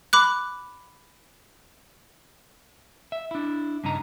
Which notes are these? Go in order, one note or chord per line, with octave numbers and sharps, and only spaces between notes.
B5 D6 F#6
E5
D4 E4
G2 C#3 D#4 A#5